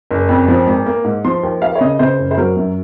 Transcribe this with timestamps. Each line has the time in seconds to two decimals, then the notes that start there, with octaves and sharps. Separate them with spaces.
0.11 F#1
0.29 F2
0.48 F3
0.67 G#1
0.86 A#3
1.04 G#2
1.25 F3 C6
1.43 D#2
1.62 D#2 F5
1.75 C#5
1.81 C#3 D#5
1.99 C#3 C5
2.18 F#1
2.31 C5
2.38 F#3 A#4
2.56 F#2